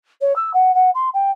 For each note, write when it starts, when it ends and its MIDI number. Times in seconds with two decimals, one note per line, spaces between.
0.21 0.35 73
0.35 0.52 88
0.53 0.74 78
0.74 0.90 78
0.94 1.08 84
1.13 1.30 79